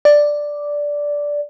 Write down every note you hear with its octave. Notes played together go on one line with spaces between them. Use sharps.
D5